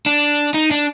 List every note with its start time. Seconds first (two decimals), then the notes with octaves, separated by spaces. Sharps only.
0.06 D4
0.54 D#4
0.71 D4